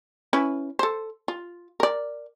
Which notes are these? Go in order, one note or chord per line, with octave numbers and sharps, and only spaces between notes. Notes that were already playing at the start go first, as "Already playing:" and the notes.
C#4 E4 B4
A4 C5
F4
A#4 D5